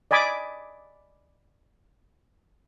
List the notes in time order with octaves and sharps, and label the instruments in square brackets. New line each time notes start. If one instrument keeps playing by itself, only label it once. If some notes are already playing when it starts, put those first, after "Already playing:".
[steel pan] D5 D#5 G#5 B5 D6